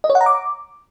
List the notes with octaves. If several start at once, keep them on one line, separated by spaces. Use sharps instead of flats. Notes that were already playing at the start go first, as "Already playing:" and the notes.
D#5
C#5
F#5
A#5
D6